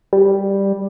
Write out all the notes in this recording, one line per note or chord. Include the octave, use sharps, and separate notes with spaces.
G3